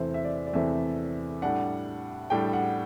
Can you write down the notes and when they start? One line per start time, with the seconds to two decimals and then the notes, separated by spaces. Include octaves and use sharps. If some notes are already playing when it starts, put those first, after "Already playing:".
Already playing: E2 C3 E3 A3 C4 C5
0.14 E5
0.25 D5
0.47 D5
0.53 E2 C3 E3 A3 C4 E5
1.42 A2 G3 D4 F#5
2.30 A2 G3 D4 G5
2.53 F#5